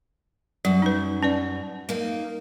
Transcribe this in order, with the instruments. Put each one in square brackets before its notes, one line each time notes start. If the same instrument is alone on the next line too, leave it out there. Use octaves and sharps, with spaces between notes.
[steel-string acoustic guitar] F#2 [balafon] G3
[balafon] D#4 B4
C#4 B4 D5
[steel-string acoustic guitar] A#3 D#4 [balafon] F5